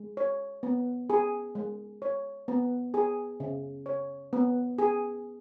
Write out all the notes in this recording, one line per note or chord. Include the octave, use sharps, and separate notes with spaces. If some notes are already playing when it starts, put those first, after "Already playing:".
Already playing: G#3
C#5
B3
G#4
G#3
C#5
B3
G#4
C#3
C#5
B3
G#4